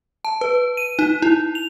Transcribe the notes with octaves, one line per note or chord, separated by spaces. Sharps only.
A5
B4
D#7
D#4
E4
F7